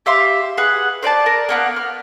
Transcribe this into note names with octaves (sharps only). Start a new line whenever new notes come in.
G4 E5 F5 C6
G#4 B4 F#5
C5 D5 G#5 A5
A#4
A#3 B3 F#5
F6